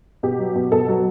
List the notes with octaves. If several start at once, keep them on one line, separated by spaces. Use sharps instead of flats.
B2 G4
F#3
B2
B2 A4
F#3